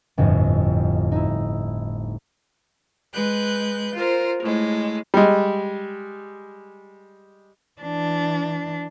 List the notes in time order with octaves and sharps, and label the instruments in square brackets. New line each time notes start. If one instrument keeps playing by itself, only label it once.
[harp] G1 F2 A2 D#5
D#4 E4
[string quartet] G#3 B4 F#6 G6
F4 A#4 C5
A2 G#3
[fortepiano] G3 G#3
[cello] E3 D4